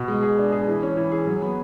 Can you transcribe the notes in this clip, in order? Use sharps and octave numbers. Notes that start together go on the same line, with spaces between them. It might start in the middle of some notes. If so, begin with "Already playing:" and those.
Already playing: B2
G#3
G#4
D4
G#4
E3
C#4
E3
G#4
F#3
B3